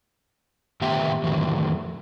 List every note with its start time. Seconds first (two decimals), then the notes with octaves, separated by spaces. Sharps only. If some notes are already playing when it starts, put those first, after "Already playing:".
0.82 A2 D#3 B3 G4 E5 G5
1.24 F2 A2 D#3 E3 F#3